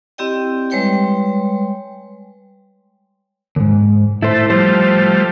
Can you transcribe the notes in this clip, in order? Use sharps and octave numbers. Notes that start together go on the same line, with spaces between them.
C4 E4 G4 D5 D#5 G5
G3 G#3 B4 C#5 G5 C6
D#2 G#2
A2 A3 E4 C5
F3 G3 A3 C5